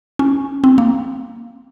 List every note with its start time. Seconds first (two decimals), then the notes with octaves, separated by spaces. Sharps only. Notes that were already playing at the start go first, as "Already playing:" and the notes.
0.19 C#4
0.64 C4
0.78 A#3